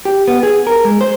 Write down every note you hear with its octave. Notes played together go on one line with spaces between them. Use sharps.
G4
B3
G#4
A#4
G#3
C5